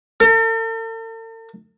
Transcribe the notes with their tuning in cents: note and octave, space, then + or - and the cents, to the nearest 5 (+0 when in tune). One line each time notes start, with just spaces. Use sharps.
A4 +45